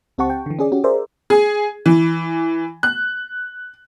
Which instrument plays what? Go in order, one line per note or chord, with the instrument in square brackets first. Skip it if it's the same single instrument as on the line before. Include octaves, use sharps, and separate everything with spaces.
[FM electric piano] C#2 C4 G4 F#5 A5 C#6
G5
D3 E3
C#4 G#4 D5
C#4 F#4 G4
G#4 A#4 C5 D5 E5
[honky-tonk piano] G#4
E3
F#6